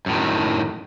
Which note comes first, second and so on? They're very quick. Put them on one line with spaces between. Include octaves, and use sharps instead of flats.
F#2 A2 D#3